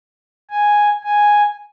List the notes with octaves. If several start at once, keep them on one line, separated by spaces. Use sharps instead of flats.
G#5
G#5